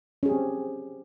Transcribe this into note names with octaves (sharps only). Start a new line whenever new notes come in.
C4 C#4 G4 G#4